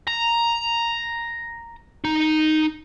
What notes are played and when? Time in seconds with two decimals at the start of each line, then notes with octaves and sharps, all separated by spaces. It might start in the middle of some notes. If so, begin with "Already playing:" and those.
0.07 A#5
2.05 D#4